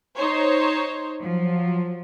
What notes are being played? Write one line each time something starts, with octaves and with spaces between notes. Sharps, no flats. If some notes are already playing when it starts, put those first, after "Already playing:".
D#4 C5 C#5
F3 F#3